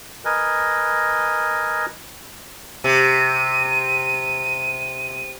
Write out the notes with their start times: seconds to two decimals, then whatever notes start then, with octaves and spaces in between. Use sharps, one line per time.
0.25 A#4 B4 D#5 G#5
2.84 C3 D#7